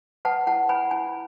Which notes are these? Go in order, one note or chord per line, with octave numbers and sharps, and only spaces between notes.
B4 F#5 A5
E4 F#5 A5
B4 G#5 B5
E4 G#5 B5